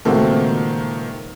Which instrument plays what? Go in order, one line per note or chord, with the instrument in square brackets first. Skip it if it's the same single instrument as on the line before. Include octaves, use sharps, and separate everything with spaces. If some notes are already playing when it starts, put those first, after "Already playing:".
[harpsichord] C#2 A#2 [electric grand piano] D#3 A#3 [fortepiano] A3 C4 F#4